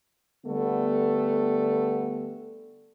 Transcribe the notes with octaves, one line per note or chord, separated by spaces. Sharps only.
D3 G3 A3 B3